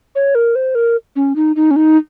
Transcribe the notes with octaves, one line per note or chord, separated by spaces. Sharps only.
C#5
A#4
C5
A#4
C#4
D#4
D#4
C#4
D#4